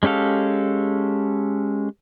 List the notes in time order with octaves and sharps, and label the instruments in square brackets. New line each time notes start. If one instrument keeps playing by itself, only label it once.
[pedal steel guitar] G#3 C#4 G4 A4 F5